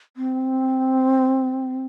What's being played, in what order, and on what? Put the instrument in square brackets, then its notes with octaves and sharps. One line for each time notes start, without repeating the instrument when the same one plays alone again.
[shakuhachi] C4